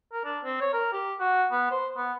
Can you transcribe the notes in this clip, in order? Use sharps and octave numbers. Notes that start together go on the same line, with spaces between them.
A#4
D4
C4
C#5
A#4
G4
F#4
B3
C5
B3